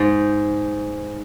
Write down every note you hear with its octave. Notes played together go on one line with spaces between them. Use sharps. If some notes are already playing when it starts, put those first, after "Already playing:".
Already playing: G#2